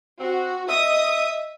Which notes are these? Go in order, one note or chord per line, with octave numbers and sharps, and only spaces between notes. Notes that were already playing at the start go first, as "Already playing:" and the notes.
C4 F#4
D#5 E5 D#6